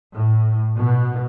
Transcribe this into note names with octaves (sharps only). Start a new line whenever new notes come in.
A2
B2